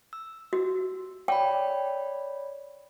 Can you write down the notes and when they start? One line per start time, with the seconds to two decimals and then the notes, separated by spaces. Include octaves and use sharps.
0.13 E6
0.53 F#4
1.28 C#5 D5 G5 B5